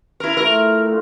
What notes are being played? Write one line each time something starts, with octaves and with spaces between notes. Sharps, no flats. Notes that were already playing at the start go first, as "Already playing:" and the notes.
E4 A#4
F3 A3 E4 A#4
A2 D4 F4